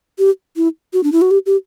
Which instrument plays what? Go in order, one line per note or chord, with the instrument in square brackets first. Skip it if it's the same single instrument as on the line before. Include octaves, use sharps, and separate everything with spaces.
[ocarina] G4
E4
F#4
D4
E4
F#4
G4
G4